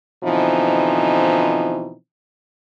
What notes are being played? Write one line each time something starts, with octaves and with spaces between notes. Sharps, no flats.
B2 D3 E3 F3 C4 D#4